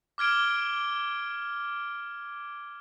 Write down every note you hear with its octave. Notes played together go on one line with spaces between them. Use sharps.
D6 F6 G#6 D7 G7